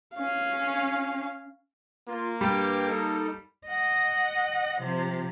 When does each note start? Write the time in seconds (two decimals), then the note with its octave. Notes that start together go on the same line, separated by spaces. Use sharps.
0.15 C#4 F5
2.08 A#3 F4
2.41 G2 G3 G5 D6
2.88 D#4 A4
3.67 D#5 F#5
4.81 C3 F3